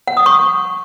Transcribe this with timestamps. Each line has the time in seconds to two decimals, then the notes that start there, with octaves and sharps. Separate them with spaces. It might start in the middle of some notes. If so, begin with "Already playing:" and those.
0.07 F#5
0.17 D#6
0.26 C#6